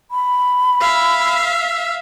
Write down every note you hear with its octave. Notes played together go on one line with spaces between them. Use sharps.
B5
E5 F5